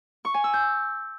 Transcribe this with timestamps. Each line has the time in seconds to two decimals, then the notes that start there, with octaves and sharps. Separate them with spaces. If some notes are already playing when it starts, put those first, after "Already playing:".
0.25 C#6
0.34 G#5
0.44 E6
0.54 G6